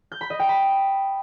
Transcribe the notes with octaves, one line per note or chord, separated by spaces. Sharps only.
G6
B5
D#5
G5
B5